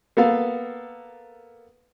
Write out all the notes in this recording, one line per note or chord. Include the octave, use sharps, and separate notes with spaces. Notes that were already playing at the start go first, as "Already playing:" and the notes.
A#3 B3 A4 F5